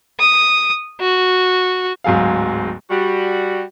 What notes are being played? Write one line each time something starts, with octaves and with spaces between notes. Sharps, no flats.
D#6
F#4
D1 G#2 F#3 G#4 F5
G3 F#4